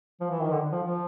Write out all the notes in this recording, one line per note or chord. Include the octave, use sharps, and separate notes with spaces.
F3
E3
D#3
D3
F3
F3